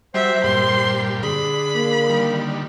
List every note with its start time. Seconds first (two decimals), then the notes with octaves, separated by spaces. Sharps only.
0.14 F#3 G3 C5 E5
0.44 G2 A#2 G3 C6
1.22 D3 G#4 B5
1.75 A#3
2.09 D3 D#3 G3